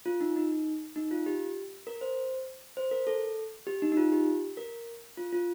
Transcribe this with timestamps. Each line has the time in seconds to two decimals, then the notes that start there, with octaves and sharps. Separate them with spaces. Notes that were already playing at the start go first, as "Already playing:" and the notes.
0.06 F4
0.21 D#4
0.36 D#4
0.96 D#4
1.11 F4
1.26 G4
1.87 A#4
2.01 C5
2.77 C5
2.91 A#4
3.07 A4
3.67 G4
3.82 D#4
3.92 D#4
3.97 F4
4.12 G4
4.57 A#4
5.18 F4
5.32 F4